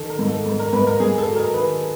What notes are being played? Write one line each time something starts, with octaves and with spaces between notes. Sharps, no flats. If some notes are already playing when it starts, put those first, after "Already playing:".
Already playing: D#3 A4
A#4
G#2
A4
G#2
A#4
G#2 B4
A#4
G#2 G#4
A4
F#3
A#4
D#3 B4